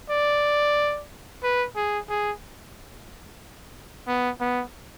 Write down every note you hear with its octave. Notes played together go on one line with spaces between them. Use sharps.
D5
B4
G#4
G#4
B3
B3